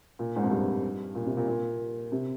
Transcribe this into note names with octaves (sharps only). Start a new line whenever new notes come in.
A#2
G#2
F2
G2
A#2
C3
A#2
A#2
C3